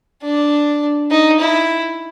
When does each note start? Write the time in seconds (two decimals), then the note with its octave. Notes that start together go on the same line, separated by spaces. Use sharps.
0.23 D4
1.11 D#4
1.40 E4